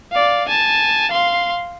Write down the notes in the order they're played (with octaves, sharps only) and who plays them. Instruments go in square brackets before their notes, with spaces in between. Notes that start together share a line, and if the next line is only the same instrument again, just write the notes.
[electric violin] D5 F5
G#5 A5
F5 C6